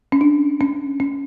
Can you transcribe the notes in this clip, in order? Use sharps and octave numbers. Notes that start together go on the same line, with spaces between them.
C#4
D4
C#4
C#4